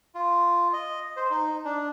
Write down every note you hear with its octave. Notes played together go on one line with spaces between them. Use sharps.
F4
D#5
C5
D#4
D4